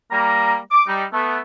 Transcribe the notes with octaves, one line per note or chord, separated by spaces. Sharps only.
G3 A#3 A#5
D6
G3 D#4
A3 B3